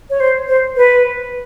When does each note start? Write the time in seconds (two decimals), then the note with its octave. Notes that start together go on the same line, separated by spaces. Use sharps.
0.10 C#5
0.20 C5
0.48 C5
0.77 B4